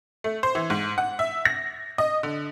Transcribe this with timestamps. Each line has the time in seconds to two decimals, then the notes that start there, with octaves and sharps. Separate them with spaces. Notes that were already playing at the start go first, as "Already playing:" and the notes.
0.24 A3
0.43 C5
0.55 E3
0.70 G#2
0.98 F#5
1.19 E5
1.45 A#6
1.98 D#5
2.23 D3